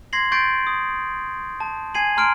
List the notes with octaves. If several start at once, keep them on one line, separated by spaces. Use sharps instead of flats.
C6 G#6 A#6 C7 F#7
C6 C#6 G6 A6 C7 D7
D#6
A5
G#5 G#6 C7 D#7 F#7
A#5 C6 F6 C7 D7